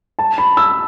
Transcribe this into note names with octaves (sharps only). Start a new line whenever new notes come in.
A5
B5
E6